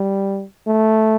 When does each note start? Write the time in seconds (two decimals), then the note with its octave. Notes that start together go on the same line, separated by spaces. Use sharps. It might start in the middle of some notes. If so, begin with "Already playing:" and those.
Already playing: G3
0.67 A3